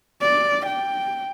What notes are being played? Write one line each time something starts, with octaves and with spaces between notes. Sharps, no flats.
D5
G5